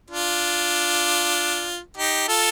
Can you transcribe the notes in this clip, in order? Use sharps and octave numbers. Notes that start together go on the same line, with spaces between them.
D4 F4
D#4 G4
F4 A4